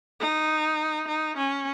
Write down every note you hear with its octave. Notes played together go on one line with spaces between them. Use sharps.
D#4
D#4
C#4